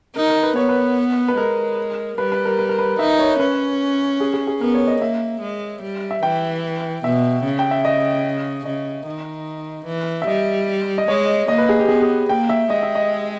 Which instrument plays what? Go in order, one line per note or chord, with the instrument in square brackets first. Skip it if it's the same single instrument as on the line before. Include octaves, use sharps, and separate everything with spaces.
[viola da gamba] D#4 [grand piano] A#4
[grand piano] A#4
B4
[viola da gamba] B3 [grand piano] C#5
[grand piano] B4
B4
[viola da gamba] G#3 [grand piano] A#4
[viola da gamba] G3 [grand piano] B4
[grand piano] B4
A#4
B4
A#4
B4
[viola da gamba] D#4 [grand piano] E5
[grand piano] C#5
[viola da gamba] C#4 [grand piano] B4
[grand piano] G#4
G#4
G#4
[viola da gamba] B3 [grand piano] A#4
[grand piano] C#5
D#5
[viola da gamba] A#3 [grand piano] E5
[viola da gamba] G#3
G3
[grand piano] E5
[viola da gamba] E3 [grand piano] G5
[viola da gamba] B2 [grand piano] E5
[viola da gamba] C#3
[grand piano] G5
E5
D#5
[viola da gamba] C#3 [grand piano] D#5
[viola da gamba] D#3
E3
[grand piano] E5
[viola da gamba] G3 [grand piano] D#5
[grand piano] D#5
[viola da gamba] G#3 [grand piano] C#5
[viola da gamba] A#3 [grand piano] D#5
[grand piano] B4
G#4
G4
[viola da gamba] B3 [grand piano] G#4
[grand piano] G#4
[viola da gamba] A#3 [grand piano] G5
[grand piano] E5
[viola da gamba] G#3 [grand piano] D#5
[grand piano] E5
D#5